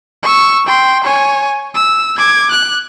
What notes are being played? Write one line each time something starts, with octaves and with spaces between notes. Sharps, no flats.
C#6 E6
G5 C6
C#5 G#5
E6
D6 G#6
F#6